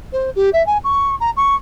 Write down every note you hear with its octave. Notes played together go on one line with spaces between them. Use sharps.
C5
G4
E5
G#5
C#6
A#5
C#6